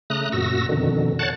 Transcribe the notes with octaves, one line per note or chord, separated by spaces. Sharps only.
C#3 A3 A#5 D#6 F#6
F#2 A#2 F#4 E6 A#6
F2 B2 D3 D#3
C#5 F#5 A5 F#6 A6